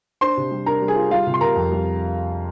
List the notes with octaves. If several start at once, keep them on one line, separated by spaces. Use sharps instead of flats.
D4 C5 C6
C3
G3
D4 A#4 A#5
G3
G#4 G#5
F4
G3 F4 F5
C3
C6
C3 A#4 A#5
F2
G3